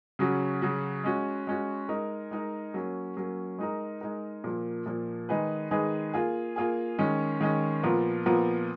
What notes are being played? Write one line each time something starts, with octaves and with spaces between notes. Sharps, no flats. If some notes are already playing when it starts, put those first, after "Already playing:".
C#3 F#3 C#4 F#4
C#3 F#3 C#4 F#4
G#3 C#4 F#4
G#3 C#4 F#4
G#3 D#4 A#4
G#3 D#4 A#4
F#3 A#3 C#4
F#3 A#3 C#4
G#3 D#4 A#4
G#3 D#4 A#4
A#2 F3 A#3
A#2 F3 A#3
D#3 G#3 D#4 G#4 B4
D#3 G#3 D#4 G#4 B4
A#3 F4 G#4
A#3 F4 G#4
D#3 G#3 C#4
D#3 G#3 C#4
A#2 F3 B3 F4 A#4
A#2 F3 B3 F4 A#4